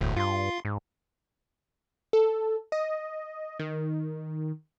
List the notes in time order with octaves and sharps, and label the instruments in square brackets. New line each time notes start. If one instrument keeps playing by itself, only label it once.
[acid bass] E1 [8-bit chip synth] D2 A2
[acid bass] G2 [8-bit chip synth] F4 C6
[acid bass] G#2
[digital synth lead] A4
D#5
D#3